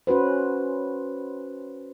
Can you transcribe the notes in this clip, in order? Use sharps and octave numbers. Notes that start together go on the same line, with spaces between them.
C#4 F#4 B4 C5